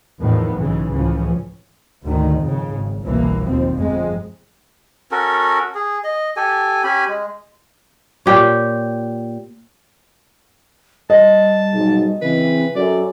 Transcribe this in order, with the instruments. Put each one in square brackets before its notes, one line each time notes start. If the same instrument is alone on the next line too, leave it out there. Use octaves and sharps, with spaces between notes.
[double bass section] E2 A2 D#3 F3 B3
B1 G#2 C#3 E3
C#2 A2 C#3 E3 F3 C#4
D2 G#2 D3 D#3
F2 C#3
G#1
G1 C2 G2 B2 E3 A#3
D#2 B2 F3 C4
G1 F2 G#3
[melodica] C#4 F#4 A4 A#4
G#4
D#5
G4 A4 G#5
C#4 G4 G#5 B5
G#3
[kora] A#2 G4 C#5
[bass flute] G3 [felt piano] D#5 [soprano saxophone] A5
[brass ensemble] B1 G#2
[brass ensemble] C#3 E3 [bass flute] C4 [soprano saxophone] B4
[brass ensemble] F#2 [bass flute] A4 [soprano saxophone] D5